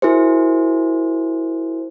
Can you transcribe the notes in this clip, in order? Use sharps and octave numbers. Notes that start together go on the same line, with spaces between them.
E4 F#4 G#4 A#4 C5